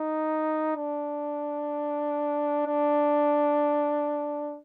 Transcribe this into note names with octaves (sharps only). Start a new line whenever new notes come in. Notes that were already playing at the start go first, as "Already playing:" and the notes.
Already playing: D#4
D4
D4